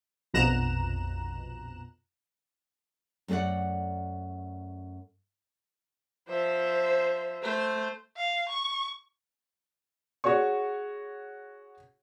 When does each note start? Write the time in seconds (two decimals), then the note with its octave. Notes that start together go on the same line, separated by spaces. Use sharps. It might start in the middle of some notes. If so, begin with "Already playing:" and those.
0.34 A#1 F2 B2 A#5 F#6 E7
3.28 F#2 A3 G#4 D5 F#5
6.29 F3 C5 E5
7.42 A3 C5
8.17 F5
8.49 C#6
10.24 F#4 G#4 C#5 C#6